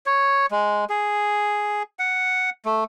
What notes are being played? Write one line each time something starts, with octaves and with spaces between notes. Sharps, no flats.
C#5
G#3
G#4
F#5
A3